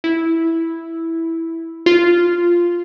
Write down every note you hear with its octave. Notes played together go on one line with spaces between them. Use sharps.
E4
F4